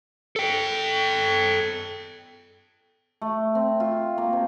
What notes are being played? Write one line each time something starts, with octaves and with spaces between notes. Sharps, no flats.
A4 G5
A3
C4
F4
A#3
C3